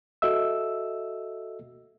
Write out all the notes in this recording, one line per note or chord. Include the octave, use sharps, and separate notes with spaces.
F#4 A4 D#5 E5 E6